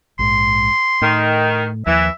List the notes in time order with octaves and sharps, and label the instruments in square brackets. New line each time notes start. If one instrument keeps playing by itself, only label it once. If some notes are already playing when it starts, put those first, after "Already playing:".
[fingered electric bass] A#1 G#2 [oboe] C6
[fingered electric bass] A2 [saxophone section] D#3
[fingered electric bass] D#2 F3 [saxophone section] E3 [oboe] E5